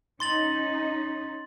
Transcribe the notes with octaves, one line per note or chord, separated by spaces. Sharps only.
C#4 D#4 C6 A6 F#7